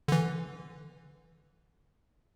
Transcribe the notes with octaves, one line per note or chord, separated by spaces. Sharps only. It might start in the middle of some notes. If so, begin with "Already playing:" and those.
D3 E3